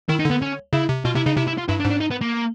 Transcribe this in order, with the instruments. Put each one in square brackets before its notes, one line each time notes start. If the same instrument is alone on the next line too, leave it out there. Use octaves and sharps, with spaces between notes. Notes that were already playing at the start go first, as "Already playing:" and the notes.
[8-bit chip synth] D#3 [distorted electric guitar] E4
[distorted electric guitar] D#4
[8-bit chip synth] D3 [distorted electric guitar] B3
[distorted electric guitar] C#4
[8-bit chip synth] C#3 [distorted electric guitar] E4
[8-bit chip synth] C3
[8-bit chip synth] B2 [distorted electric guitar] F4
[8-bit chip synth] C3 [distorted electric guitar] E4
[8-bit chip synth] C#3 [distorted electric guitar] D#4
[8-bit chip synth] C3 [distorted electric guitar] E4
[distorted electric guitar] E4
F4
[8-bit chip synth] G2 [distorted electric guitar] E4
[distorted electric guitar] D4
[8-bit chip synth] G#2
[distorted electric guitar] D4
D#4
B3
A#3